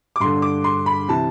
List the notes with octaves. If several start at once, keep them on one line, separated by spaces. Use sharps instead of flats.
D6
G2 D3 C6
D6
C6
B5
C3 E3 A5